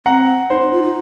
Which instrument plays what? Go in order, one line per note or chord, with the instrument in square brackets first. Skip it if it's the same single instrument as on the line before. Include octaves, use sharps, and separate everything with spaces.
[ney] C4 [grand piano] F#5 A#5
[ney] D#4 [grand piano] C5
[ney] D#4
F4
D#4